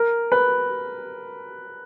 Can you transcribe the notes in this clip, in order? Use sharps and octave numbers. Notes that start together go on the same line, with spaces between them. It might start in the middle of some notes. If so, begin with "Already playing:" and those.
Already playing: A#4
B4